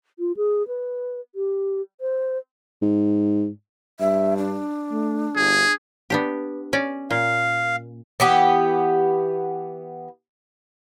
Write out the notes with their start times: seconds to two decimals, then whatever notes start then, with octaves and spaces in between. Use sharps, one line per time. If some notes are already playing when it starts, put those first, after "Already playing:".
0.19 F4
0.37 G#4
0.68 B4
1.35 G4
2.01 C5
2.82 G#2
4.00 G2 E5
4.37 D4
4.92 A3
5.36 G1 G#4
6.10 B3 D4 G4
6.73 C#4 D5
7.11 A#2 F5
8.20 E3 B3 G4